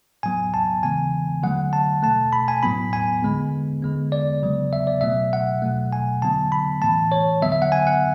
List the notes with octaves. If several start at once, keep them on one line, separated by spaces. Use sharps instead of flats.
A2 F#3 B3 G#5
A5
C#3 E3 G#3 B3 G#5
D3 F#3 A3 F#5
A5
B2 A3 A5
B5
G#5
A2 F#3 B3 B5
G#5
D3 G#3 B3
D3 G#3 B3
D5
C#3 F#3 B3
E5
D5
B2 F#3 A3 E5
F#5
B2 F#3 A3
G#5
D3 F#3 B3 A5
B5
A2 E3 A3 A5
C#5
D3 F#3 B3 E5
E5
F#5
G#5
F#5